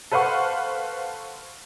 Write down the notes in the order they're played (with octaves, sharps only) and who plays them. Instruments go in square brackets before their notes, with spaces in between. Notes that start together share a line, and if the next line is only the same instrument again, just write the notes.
[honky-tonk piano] A4 B4 C5 F5 F#5 C#6